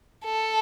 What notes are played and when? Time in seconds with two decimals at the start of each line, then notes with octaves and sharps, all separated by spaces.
0.24 A4